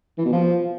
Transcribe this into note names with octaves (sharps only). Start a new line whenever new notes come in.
E3
B2
F3